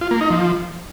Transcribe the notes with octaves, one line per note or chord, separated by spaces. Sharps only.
F4
A#3
D#4
F3